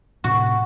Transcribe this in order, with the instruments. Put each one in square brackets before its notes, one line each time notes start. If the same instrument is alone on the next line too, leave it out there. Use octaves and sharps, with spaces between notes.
[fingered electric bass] A2 C3 [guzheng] F#4